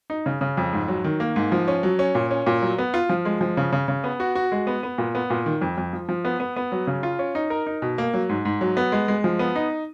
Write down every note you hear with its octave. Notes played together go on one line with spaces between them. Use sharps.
D#4
C#3
C#3
F2
G#2
F#3
D#3
A#3
G#2
F3
C#4
F#3
C#4
A#2
C#4
A#2
F#3
B3
F4
F3
G#3
F3
C#3
C#3
C#3
B3
F#4
F#4
G#3
B3
B3
A#2
B3
A#2
D#3
F2
F2
F3
F3
B3
B3
B3
F#3
C#3
F4
C#4
D#4
A#4
D#4
B2
A#3
F#3
G#2
G#2
F#3
B3
G#3
G#3
F3
B3
D#4